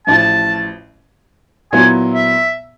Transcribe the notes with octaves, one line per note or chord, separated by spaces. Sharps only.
A1 A2 F3 A5
A#2 F#3 B3 E4 G#5
E5